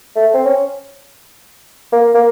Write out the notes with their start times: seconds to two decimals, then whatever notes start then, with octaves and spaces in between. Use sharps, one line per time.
0.16 A3
0.34 C4
0.45 C#4
1.92 A#3
2.14 A#3